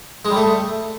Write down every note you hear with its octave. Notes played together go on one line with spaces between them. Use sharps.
G#3
G3
A3